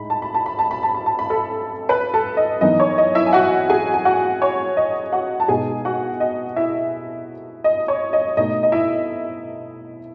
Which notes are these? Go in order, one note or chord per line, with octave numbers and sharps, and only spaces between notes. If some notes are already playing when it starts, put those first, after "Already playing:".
Already playing: A2 G#3 D#4 B5
A5
B5
A5
B5
A5
B5
A5
B5
A5
B5
A4 A5
B4 B5
A4 A5
D#5
F#2 E3 B3 D#4 D#5
C#5
D#5
E4 E5
G#5
F#4 F#5
G#4 G#5
G#5
F#4 F#5
C#5
D#5
F#4 F#5
A5
B2 G#3 D#4 G#4 G#5
F#4 F#5
D#5
E4 E5
D#5
C#5
D#5
B2 A3 D#4 D#5
D#5
E4 E5